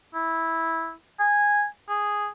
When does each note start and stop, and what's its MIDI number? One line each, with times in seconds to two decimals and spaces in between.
0.14 0.93 64
1.20 1.65 80
1.89 2.28 68